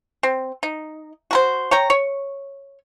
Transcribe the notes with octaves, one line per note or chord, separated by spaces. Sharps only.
C4
D#4
F#4 A#4 C5
C#5 G5 A#5
C#5